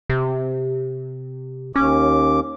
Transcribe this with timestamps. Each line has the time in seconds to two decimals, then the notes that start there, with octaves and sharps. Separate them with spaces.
0.10 C3
1.76 D#2 C#4 D6